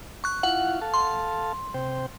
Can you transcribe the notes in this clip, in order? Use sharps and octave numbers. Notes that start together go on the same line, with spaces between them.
C#6 F#6
E4 F4 F5 F#5
A4 F5 A5
C6
C3 C5 G5